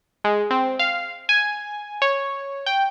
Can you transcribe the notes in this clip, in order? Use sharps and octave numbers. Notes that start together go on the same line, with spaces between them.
G#3
C4
F5
G#5
C#5
G5